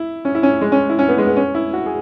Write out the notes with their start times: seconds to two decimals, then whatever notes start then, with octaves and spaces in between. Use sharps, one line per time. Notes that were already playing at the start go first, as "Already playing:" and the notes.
Already playing: E4
0.25 C#4
0.35 E4
0.43 C#4
0.61 G#3
0.72 C#4
0.89 E4
0.99 C#4
1.09 B3
1.18 G#3
1.27 B3
1.36 C#4
1.55 E4
1.73 F#4
1.86 G#4